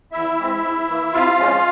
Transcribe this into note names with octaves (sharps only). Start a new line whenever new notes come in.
E2 E4 E5
E3 G#3 C4
G#2
E3 A#3
C3 F4 F5
F3 G#3 C#4